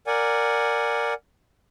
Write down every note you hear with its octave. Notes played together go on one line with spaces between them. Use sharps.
A#4 D5 F#5 G#5